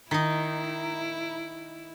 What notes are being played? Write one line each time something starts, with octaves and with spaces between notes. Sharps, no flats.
D#3 D#4 E4